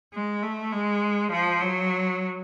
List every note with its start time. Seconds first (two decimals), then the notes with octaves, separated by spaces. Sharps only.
0.13 G#3
0.43 A3
0.73 G#3
1.32 F3
1.62 F#3